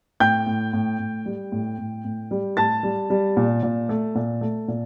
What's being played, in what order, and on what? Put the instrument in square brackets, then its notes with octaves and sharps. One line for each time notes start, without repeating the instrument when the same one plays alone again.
[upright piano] A2 G5 G6
A2
A2
A2
G3
A2
A2
A2
G3
A2 A5 A6
G3
G3
A#2
A#2
A3
A#2
A3
A#2